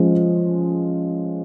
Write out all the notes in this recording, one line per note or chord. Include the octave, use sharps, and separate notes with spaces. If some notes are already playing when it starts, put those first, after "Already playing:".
Already playing: F3 G#3 C#4